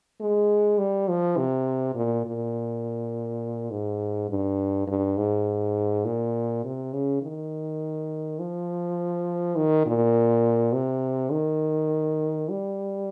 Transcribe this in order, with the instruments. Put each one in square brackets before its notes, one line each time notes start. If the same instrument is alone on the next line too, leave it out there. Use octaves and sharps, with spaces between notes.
[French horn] G#3
G3
F3
C3
A#2
A#2
G#2
G2
G2
G#2
A#2
C3
C#3
D#3
F3
D#3
A#2
C3
D#3
G3